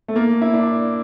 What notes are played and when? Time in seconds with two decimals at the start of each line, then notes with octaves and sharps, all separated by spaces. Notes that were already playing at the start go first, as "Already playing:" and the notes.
0.08 A3
0.16 A#3
0.42 E4
0.54 D4